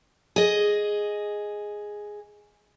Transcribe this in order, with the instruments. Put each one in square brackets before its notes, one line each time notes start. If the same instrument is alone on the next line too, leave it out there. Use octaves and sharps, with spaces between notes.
[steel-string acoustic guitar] G#4 D#5